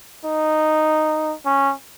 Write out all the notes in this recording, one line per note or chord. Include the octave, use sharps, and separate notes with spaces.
D#4
C#4